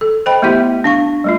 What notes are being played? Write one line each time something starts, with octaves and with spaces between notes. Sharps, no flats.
A4
C5 D#5 G5 B5
A3 B3 E4 G4 E5
D4 F5 C#6
G3 A3 F4